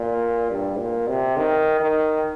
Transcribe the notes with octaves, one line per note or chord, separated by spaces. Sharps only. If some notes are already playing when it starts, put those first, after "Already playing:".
Already playing: A#2
G2
A#2
C3
D#3
D#3